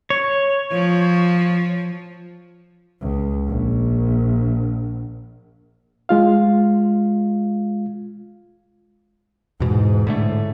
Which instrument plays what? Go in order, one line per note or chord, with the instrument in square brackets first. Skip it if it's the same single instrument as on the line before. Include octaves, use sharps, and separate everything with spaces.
[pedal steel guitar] C#5
[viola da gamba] F3
[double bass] C#2
A#1
[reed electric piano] G#3 F4 F5
[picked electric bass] E2 B2 [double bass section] G#2
[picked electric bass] A2 D3 A3